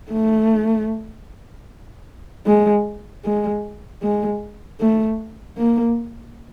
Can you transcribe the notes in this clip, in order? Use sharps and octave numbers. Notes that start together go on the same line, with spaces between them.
A3
G#3
G#3
G#3
A3
A#3